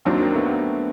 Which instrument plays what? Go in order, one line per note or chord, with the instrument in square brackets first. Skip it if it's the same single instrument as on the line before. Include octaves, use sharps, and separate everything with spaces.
[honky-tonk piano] D#2 D#3 F#3 [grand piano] C4 D4
[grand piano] A#3 C4
A3 B3